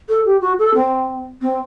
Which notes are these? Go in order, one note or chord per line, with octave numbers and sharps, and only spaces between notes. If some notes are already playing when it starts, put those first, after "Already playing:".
A4
G4
F#4
A4
C4
C4